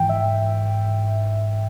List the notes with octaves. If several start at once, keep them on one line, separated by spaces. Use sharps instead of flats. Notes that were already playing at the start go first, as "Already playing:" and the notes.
Already playing: G#2 E3 G5
E5